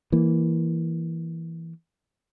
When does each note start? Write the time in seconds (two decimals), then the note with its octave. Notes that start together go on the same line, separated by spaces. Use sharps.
0.12 E3 A#3